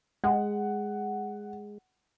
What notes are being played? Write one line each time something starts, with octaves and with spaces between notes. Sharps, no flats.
G#3 F#5